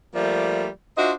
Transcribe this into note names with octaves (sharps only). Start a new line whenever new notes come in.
F3 G3 A3 A#3 D5 E5
D4 F4 F#4 C5 D#5 E5